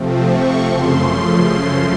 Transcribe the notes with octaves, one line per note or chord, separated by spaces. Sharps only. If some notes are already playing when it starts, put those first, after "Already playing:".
Already playing: C3 F3 A3 C4
C#6
F#2 C#3 F3 A3 C6